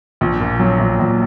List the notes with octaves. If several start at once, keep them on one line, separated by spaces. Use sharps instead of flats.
A#1
A#2
F#3
A#1
A#1